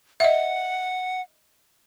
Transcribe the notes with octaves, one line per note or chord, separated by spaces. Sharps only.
D#5 E5 F#5